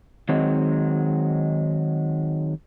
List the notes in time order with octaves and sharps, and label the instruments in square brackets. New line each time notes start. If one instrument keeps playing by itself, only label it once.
[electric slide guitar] D#3 F#3 G#3 C4